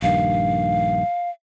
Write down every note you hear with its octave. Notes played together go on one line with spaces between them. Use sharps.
A#1 G2 D#3 F5